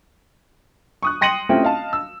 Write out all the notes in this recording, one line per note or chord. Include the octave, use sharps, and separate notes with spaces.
C#6 D#6 F#6
G5 C6 A#6 C#7 D#7 F#7
A3 C4 C#4 E4 F4 G4
D#5 F5 A5
E6